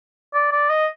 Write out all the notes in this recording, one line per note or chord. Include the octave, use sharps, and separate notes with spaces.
D5
D5
D#5